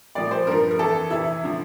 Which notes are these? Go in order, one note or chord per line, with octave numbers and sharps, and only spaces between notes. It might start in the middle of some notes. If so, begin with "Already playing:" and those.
A2 F3 D5
C5
G2 F3 A#4
A#4
F2 E3 A4
F2 C3 E3 E4
D3 F3